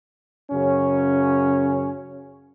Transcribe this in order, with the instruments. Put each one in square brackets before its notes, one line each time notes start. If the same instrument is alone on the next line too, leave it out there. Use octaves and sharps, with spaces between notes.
[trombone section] F#2 C#3 C#4